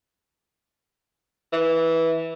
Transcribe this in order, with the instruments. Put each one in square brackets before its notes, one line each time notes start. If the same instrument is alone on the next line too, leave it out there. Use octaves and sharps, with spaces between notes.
[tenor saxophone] E3